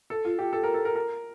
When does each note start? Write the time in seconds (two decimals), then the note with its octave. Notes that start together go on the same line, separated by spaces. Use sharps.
0.10 A4
0.25 F4
0.39 G4
0.53 A4
0.64 A#4
0.74 A4
0.85 A#4
0.96 A#4